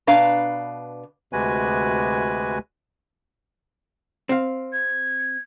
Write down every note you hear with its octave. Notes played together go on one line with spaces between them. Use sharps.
B2 D4 B4 F5 A#5
D2 C3 G#3 F#4 B4 G#5
C4 F5
G#6